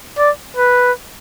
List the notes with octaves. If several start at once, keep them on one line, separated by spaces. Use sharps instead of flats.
D5
B4